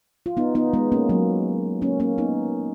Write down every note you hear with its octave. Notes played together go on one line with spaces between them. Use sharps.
F4
B3 D#4
B3 D#4
G#3 B3
A#3 C#4
F#3 A#3
A#3 C#4
A#3 C#4
B3 D#4